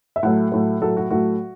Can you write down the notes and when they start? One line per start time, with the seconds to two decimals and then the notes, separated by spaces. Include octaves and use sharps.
0.16 E5
0.23 A2 F#3 A3 F#5
0.52 A2 F#3 A3
0.81 A2 F#3 A3 A4
0.97 F#4
1.10 A2 F#3 A3 F#4